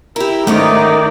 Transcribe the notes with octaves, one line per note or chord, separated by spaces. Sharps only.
E4 G4 A#4
G#2 D#3 A3 C#4 D#4 A#4 D5